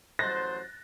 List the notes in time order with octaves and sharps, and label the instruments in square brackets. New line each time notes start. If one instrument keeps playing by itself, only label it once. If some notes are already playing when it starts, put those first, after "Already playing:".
[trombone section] A1 F#3 C5 [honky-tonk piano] F#6 A6 A#6